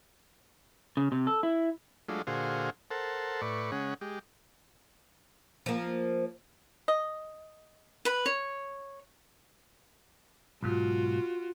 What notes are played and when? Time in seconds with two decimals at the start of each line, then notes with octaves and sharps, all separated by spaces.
0.97 C#3
1.12 C3
1.27 A4
1.43 E4
2.09 F#3 G#3 A3 D4 F4
2.27 A#2 D3 F#4 G#4 C5 F5
2.91 A4 A#4 C5 F#5 A5
3.41 A2 B4 D5 C#6
3.72 C#3 G#3 C#4 F#5
4.01 G#3 G4
5.66 F3 A#3
6.88 D#5
8.05 B4 B5
8.26 C#5
10.63 B1 G#2 F4 F#4